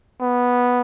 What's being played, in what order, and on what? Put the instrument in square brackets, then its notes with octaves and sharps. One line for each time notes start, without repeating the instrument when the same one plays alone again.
[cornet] B3